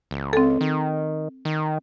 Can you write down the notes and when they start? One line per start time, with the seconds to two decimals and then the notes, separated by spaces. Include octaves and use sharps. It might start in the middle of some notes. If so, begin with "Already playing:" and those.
0.11 C#2
0.33 C4 A4
0.61 D#3
1.45 D#3